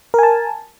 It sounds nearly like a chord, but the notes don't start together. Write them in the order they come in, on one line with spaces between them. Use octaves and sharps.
A#4 G#5 A5